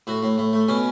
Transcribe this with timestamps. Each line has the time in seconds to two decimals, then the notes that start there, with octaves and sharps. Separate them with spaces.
0.07 A2 F#4
0.23 A2
0.38 A2
0.53 A3
0.68 B2 C#4